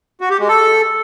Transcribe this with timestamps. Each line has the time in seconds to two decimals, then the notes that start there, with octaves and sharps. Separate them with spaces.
0.21 F#4
0.30 G4
0.39 G#3
0.48 A4